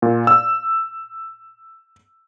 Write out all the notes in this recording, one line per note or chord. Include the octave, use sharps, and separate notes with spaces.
A#2
E6